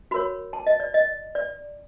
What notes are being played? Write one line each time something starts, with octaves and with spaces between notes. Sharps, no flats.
F#4 A#4 C#5 B5
A5
D#5
D5
D#5
D5